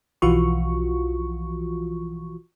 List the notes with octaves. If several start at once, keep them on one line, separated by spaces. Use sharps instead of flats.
B1 E3 F3 F4 F#4 C#6